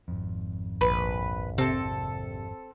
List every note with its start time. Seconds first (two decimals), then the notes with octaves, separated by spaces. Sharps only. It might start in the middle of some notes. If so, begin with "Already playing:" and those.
0.08 G#1 F2
0.81 A#1 B4
1.58 C3 C4 A4